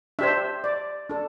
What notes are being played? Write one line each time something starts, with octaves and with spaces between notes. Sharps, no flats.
D4 G4 C5 E5
D5
D4 A4